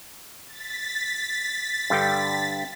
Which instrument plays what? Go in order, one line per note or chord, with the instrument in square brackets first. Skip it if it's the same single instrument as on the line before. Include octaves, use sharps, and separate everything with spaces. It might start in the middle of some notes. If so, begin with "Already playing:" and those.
[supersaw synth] A6 B6
[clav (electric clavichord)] G2 D3 G5